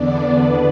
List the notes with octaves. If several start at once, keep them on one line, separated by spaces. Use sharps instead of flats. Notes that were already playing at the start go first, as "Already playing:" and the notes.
Already playing: E2 D3 B3 D4 D5
B3 B4